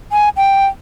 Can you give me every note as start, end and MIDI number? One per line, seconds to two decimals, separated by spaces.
0.12 0.29 80
0.37 0.66 79